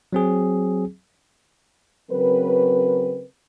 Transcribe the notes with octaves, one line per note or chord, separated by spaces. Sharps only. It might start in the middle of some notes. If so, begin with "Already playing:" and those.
F#3 C4 G#4
C#3 F#3 C4 A#4 B4